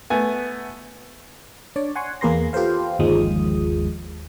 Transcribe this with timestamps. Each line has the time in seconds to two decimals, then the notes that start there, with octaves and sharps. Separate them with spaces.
0.10 A3 B3 G#5
1.76 D4 C#5 D5
1.96 F#5 G#5 C6 C#6
2.21 E2 A#3 G#4 B4 C6 A#6
2.53 F4 G4 A4 B4 C5 F5
2.99 G1 D#2 F3 G#3 D#6